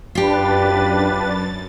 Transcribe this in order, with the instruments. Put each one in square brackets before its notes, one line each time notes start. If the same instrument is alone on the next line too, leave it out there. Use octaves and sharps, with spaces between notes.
[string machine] F#2 A6 [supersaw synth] D4 B4 [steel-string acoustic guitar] F4 G4